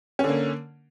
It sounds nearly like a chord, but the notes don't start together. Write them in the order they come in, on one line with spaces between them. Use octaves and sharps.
C#4 D3 A#3